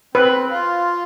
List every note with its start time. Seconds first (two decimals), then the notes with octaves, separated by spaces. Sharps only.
0.15 C4 B4
0.50 F4